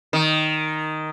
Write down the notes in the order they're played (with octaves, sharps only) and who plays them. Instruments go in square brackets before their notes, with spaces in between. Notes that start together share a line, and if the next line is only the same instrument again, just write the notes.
[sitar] D#3